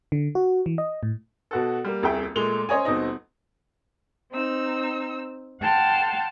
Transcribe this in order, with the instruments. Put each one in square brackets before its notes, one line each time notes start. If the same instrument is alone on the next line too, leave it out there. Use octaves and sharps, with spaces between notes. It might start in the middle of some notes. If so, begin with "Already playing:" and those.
[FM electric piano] D3
F#4
E3
D#5
A2
[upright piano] B2 F#4 A4
G3 A#3
D#1 C2 G#4 E5 G5
A#2 G#3 A3 F7 G7
C#4 C5 C#5 D#5 G#5
D#1 B2 C4 D#4 D#5
[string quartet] C4 D#4 E6
F#5 G5 A5 C6 F6